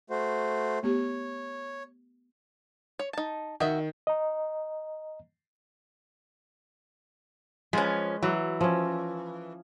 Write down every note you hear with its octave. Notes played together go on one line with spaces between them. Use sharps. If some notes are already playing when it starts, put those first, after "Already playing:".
A3 F#4 C5
A3 B3 G4 C#5
C#5
D#4 A5
D#3 F#4 D#5 E5
D#5 A#5
F3 G#3 C#4 B4
E3 F#3
F3 C#4